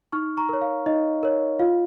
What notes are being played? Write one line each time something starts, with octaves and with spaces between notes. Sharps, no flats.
D#4 C#6 F6
A#5 C#6
A#4 C#5
F5
D#4 D#5
A#4 C#5
F4 F5